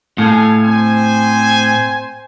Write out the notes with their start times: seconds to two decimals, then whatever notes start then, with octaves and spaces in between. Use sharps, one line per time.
0.18 A2 A4 F5 G#5
0.63 C4 C5 G#5